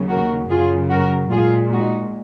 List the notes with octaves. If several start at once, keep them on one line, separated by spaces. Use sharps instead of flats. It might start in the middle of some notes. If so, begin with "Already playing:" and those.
Already playing: D#2 C#3 F#3
F#4 A#4
F#2 C#3 F#3 F4 G#4
F#4 A#4
A#2 G#3 F4 G#4
D#4 F#4